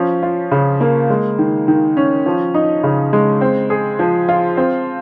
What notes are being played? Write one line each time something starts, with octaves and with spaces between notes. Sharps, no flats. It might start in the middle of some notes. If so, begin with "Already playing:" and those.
Already playing: F3 C#4
F4
C#3
A#3
G#3
D#3
D#3
C#4
F3
D#4
C#3
G#3
C4
G#4
F3
F4
C4